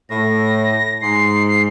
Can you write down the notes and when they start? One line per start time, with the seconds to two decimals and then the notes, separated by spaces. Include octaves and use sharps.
0.10 A2 A#6
1.01 G#2 C7
1.48 C7